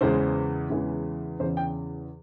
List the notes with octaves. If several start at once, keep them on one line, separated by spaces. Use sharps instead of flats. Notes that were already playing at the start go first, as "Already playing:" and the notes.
E2 C#3 E3 G#3 C5
E2 C#3 E3 G#3
E2 C#3 E3 C5
G5